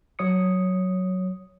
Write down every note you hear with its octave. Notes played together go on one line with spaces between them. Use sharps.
F#3 C#5 D#6 C#7